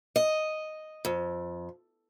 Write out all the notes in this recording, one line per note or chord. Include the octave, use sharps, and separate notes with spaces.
D#5
F2